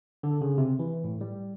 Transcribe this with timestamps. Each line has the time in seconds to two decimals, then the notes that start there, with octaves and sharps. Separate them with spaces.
0.23 D3
0.41 C#3
0.58 C3
0.79 E3
1.04 A2
1.21 G3